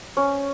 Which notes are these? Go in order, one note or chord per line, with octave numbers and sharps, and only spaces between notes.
C#4